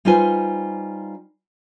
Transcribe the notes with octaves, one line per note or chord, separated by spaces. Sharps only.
G3 D#4 F4 B4 C5 G#5